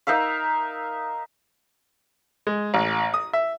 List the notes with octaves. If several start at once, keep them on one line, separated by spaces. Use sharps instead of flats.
D#4 A#4 E5 F5
G#3
A1
D#6
E5